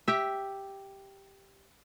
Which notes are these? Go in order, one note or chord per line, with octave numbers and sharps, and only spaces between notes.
G4 E5